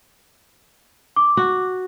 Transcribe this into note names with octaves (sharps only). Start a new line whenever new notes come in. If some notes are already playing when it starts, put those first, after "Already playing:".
D6
F#4